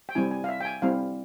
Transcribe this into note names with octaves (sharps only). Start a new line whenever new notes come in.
G5
G3 C4 E4 G#5
G#5
F5
E5
G5
G#5
G3 C4 E4 F5